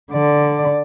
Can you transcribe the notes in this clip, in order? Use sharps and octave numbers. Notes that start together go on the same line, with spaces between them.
D3 D5